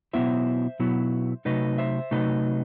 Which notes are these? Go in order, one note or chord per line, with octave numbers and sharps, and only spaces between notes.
B2 F#3 B3 E4 C5 E5
B2 F#3 B3 E4
C3 F#3 A3 D#4 B4 D#5
C5 E5
C3 F#3 A3 D#4 B4 D#5